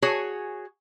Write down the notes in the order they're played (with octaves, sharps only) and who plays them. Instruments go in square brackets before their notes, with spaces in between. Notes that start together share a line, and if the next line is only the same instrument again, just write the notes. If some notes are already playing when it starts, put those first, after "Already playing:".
[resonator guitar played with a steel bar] F#4 G#4 C#5 G#5